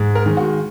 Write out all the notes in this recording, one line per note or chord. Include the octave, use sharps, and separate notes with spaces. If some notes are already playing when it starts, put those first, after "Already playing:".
Already playing: G#2
A#4
D#3 G#3
F#4